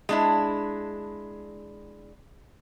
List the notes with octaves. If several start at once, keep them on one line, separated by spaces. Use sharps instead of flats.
G#3 D4 E4